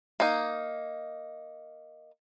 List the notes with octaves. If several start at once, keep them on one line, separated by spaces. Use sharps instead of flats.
A#3 D#4